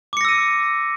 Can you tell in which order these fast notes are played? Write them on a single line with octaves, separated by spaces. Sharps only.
D6 C#7 A#6 E6 D#7